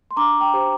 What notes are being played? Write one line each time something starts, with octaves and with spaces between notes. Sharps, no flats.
C6
D4 A#5 D6
G5 A#5
G4 C5